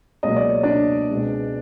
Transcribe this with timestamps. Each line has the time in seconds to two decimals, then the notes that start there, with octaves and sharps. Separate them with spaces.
0.23 C#2 B2 F#3 A#3 D#5
0.36 D5
0.50 C#5
0.63 D4 D5
1.10 C#2 B2 G#3 C4